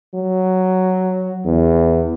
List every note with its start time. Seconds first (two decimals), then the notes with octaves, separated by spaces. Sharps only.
0.14 F#3
1.45 E2